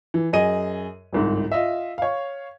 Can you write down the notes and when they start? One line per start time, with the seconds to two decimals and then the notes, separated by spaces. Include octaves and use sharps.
0.14 E3
0.33 F#2 G#4 D#5 D#7
1.13 G1 C2 G#2
1.52 F4 D#5 E5
1.98 C#5 F5